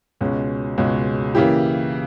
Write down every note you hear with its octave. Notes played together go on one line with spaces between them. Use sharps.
C#2 B2 G#3 C#4
C#2 B2 G#3 C#4
C#3 E3 A#3 E4 G4